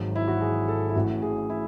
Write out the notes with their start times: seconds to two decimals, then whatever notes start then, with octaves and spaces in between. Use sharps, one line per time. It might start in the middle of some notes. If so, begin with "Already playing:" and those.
Already playing: G#1 G#2 F#3
0.16 E4
0.28 F#4
0.41 G#4
0.68 A4
0.90 E4
0.95 A1 A2 E3 F#4
1.22 G#4
1.50 E4